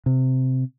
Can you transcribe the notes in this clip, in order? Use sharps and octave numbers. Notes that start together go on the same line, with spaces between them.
C3